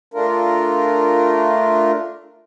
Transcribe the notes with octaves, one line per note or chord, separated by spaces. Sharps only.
A3 D4 F4 A#4